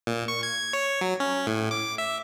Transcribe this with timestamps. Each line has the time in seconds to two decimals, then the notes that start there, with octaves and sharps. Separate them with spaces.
0.07 A#2
0.28 C#6
0.43 G#6
0.73 C#5
1.01 F#3
1.20 C#4
1.47 A2
1.71 D6
1.98 E5